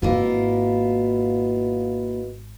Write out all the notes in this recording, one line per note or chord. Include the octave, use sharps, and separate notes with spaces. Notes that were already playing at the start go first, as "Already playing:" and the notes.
G#1 G#2 B2 A#3 E4 F4